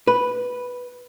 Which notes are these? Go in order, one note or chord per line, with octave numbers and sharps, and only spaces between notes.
B4